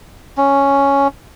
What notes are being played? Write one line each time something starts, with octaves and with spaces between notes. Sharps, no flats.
C#4